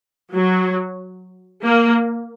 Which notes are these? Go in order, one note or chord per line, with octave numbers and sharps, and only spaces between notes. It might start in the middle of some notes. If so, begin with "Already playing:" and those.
F#3
A#3